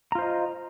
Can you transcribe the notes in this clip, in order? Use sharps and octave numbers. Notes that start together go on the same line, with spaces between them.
F4 C5 D#5 A#5